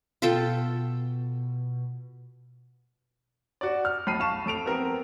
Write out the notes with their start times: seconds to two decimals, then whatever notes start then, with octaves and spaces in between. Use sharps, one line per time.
0.22 B2 F4 A4 G5
3.61 F#4 D5
3.85 F6
4.07 B1 B5 C7 D#7
4.20 F5 A5 C#6 E7
4.46 F2 A4 D7 F7
4.65 B3 C4 A#4